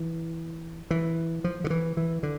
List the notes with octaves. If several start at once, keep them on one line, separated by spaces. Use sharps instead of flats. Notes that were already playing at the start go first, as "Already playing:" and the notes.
Already playing: E3
E3
F3
D3
E3
E3
D3